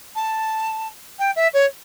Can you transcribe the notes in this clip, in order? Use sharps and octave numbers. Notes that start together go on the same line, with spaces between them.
A5
G5
E5
C#5